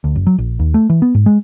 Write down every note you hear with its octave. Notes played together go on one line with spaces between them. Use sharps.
D2
F#1
F#3
A#1
D#2
A3
E3
B3
G#2
G#3